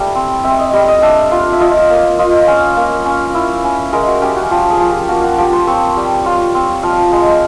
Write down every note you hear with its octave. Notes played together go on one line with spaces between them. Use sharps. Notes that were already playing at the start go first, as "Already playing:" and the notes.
Already playing: G3 A3 E4
C4
C4 E5
D#5
G3 D#5
D#5
D4 E5
F4 F5
E5
F4 D#5
A#3
F4 D#5
C#4
A#3
C#4
E4
C#4
G#3 A#4
F#4
C#4 G4
F#4
F3 G4
G#4
F3
G4
A#3 F#4
F#4
F3 G4
C5
C4 C#5
G3
F4 C#5
C4
F3 F5
G#3